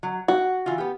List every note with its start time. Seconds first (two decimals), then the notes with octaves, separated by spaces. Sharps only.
0.03 F#3
0.28 F#4 F#5
0.66 E3 F4
0.78 B3 G4